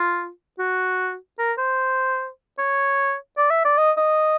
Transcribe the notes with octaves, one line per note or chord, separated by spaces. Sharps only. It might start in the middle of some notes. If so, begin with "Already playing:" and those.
Already playing: F4
F#4
A#4
C5
C#5
D5
E5
D5
D#5
D#5